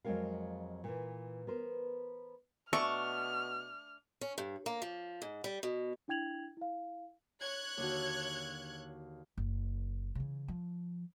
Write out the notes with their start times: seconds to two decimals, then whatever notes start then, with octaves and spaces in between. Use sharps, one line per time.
0.05 F2 F#3 G#3 C#4 A#4 F5
0.84 A#2 E3
1.47 B3 A#4 C5
2.73 B2 A3 D4 C#6 F6
4.21 C#4
4.38 G2
4.66 A#3
4.82 F3
5.22 G#2
5.44 G3
5.63 B2
6.08 D4 E4 G5 G#6 F7 F#7
6.57 E4 F5
7.40 C#5 F#6 G#6
7.77 D#2 D3 F#4
9.38 F#1
10.15 C#3 E3
10.48 F3